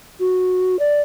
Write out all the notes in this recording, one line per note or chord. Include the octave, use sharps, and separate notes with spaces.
F#4
D5